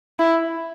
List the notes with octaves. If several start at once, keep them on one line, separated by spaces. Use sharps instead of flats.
E4